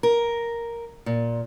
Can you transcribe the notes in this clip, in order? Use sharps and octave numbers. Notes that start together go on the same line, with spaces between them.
A#4
A#2